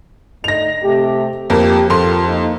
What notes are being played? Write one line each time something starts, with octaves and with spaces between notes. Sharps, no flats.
D3 A3 D#4 A#6 F7
C3 A3 G4
F2 A#3 G4
F2 A#3 F4 A4 C6
A#3 D#4